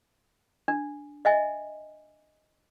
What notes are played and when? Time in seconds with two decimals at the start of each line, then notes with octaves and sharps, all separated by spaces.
0.68 D4
1.25 D#5 E5 G#5